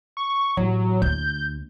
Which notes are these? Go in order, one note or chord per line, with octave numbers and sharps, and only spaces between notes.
C#6
A1 F#3
D2 G6